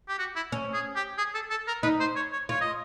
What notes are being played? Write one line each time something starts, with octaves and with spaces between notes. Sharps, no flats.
G4
F#4
E4
C#4
G#4
G4
G#4
A4
A4
A#4
D#4 B4
C5
C#5
C#5
F4 C#5
D#5